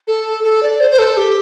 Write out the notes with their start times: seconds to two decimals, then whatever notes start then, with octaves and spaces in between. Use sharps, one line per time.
0.07 A4
0.44 A4
0.63 D5
0.80 C5
0.91 C5
0.99 A4
1.17 G4